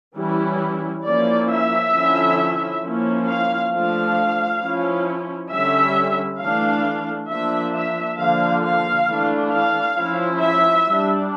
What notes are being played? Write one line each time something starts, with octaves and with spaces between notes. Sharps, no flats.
E3 G3 C#4 E4
F3 A#3 C#4 E4 D5
E5
D3 F3 C#4 E4
F3 A#3 C#4 E4
F5
F3 A3 D4 F5
F3 C#4 E4
D3 G3 C#4 E5
E3 A3 D4 F5
F3 A#3 D4 E5
E5
D3 F3 A#3 D4 F5
F5
E3 A3 D4
F5
F3 C#4 E4
E5
G3 D4